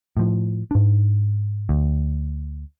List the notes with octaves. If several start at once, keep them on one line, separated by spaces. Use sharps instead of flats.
A2 F3
G#2 D4
D2